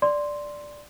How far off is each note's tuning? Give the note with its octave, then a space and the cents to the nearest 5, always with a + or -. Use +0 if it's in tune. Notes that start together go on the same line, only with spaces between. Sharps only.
D5 +0 C6 +0